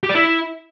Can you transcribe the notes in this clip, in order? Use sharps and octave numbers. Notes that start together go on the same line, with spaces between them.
G4
D5
E4